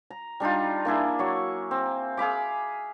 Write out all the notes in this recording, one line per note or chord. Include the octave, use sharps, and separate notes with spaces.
A#5
G3 D4 D#4 F4
A#3 D4 E4 G#4
F#3 C#6
C4
G#4 F5 B5 D6